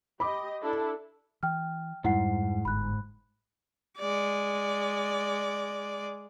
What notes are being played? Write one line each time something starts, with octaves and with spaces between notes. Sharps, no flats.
G4 D#5 B5 D6
D4 E4 A4
E3 G5 F6
F2 G#2 G3 E4 F#5 C7
G1 B5 F#6
G#3 D5